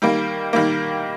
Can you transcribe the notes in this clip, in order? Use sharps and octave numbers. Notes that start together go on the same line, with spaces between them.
D#3 G3 A#3
D#3 G3 A#3